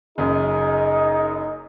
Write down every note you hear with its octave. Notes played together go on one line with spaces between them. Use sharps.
F#1 F#2 D#4 G#4